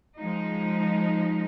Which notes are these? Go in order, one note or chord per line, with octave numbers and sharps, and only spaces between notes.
F3 G#3 D#4